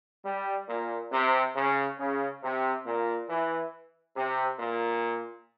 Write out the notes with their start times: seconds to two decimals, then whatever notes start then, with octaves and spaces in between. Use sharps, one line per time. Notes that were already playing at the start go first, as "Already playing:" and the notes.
0.25 G3
0.69 A#2
1.12 C3
1.55 C#3
1.98 C#3
2.43 C3
2.86 A#2
3.30 E3
4.16 C3
4.60 A#2